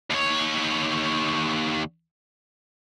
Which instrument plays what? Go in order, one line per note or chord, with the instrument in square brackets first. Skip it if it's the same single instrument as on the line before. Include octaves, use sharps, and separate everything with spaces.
[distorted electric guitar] D#2 C#5